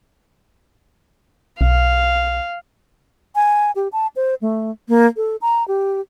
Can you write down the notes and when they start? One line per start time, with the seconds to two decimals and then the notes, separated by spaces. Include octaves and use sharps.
1.61 B1 F5
3.35 G#5
3.76 G4
3.92 A5
4.16 C5
4.42 A3
4.89 A#3
5.17 A4
5.42 A#5
5.68 G4